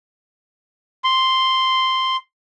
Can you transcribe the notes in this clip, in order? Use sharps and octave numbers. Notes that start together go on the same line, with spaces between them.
C6